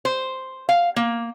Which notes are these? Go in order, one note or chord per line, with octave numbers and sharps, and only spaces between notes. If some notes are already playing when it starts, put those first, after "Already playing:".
C5
F5
A#3